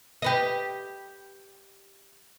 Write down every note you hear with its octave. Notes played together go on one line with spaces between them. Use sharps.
G4 B4 D#5